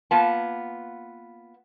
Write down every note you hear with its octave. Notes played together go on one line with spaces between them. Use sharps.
A#3 B3 F4 A5